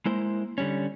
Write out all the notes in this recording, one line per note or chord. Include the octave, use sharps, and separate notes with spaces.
G#3 A#3 E4 C5
D3 G3 C#4